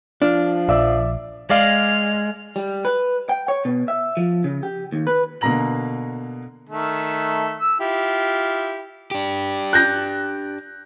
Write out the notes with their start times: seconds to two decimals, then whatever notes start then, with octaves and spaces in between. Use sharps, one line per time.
0.22 F3 D4 F6
0.69 A#1 D5 E5 E6
1.50 G#3 D5 F5 D6 F6
2.56 G3
2.85 B4
3.29 G5
3.48 C#5
3.65 B2
3.88 E5
4.17 F3
4.44 C#3
4.63 G4
4.92 D#2
5.07 B4
5.41 B2 D3 A#3 A#5 A#6 F#7
6.69 D#3 A3
7.60 E6
7.80 E4 F4 G4
9.11 D4 G4
9.73 F#6 G6 A#6